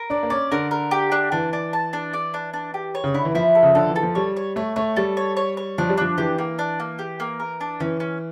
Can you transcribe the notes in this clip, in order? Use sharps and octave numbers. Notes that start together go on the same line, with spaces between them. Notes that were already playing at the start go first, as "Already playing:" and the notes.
Already playing: A#4
D4 D5
A#3
C#4 D5
D3 A#4
A#4
G4
D4
E3 D4
D4
A5
D4
D5
D4
D4
G4
C#5
C#3
D3 E4
E3
F3 E4
A4
C#3
D3 A4
E3
A4
F3
G3 C#5
C#5
A3 C#5
A3 C#5
G3 A4
C#5
C#5
C#5
F3 D4
G3
F3 D4
E3 G4
A#3
D4
A#3
G4
A#3
A#4
D4
E3 C#4
C#4